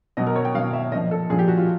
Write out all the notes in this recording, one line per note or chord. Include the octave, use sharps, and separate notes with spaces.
B2 F#3 D#5
A#4
C#5
G5
B2 F#3 F5
E5
A#2 F3 D#5
A4
A#2 F3 G#4
G4
F#4
F4